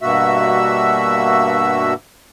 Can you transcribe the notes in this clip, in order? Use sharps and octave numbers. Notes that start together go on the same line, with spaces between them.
G2 B2 A#3 F#4 E5 E6